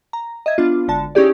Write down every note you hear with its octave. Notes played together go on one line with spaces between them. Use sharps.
A#5
D#5 E5 G#6
B3 D4 F4
G#1 D3 A5
C#4 D#4 E4 G4 G#4 D5